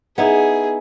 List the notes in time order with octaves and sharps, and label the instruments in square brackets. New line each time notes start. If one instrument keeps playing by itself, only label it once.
[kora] B3 D#4 E4 [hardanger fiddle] G#4